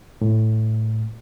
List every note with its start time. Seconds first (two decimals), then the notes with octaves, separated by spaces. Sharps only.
0.21 A2